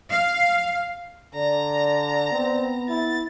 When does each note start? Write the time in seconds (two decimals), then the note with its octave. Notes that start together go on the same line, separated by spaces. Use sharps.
0.10 F5
1.34 D3 D5 A#5
2.32 B3 C4
2.89 E4 A6